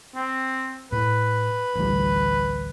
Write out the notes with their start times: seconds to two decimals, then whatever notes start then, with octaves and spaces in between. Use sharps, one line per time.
0.15 C4
0.92 A2 B4
1.75 A1 D2 G3